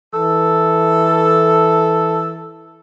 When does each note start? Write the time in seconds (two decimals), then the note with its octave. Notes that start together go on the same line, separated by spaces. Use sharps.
0.14 E3 A4